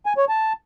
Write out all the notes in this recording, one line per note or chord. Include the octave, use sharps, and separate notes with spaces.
G#5
C#5
A5